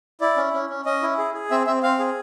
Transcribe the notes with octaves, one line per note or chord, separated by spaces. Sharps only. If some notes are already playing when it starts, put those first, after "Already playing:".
E4 D5
C#4
C#4
C#4
C#4 D#5
E4
G#4
G#4
C4 E5
C4 E5
C4 F5
G#4